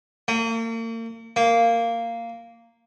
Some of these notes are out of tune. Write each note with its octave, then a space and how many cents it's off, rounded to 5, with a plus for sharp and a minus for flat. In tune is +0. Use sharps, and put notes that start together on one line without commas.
A#3 -40
A#3 -10